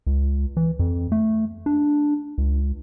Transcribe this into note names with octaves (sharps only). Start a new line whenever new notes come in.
C#2
E3
F2
A3
D4
C#2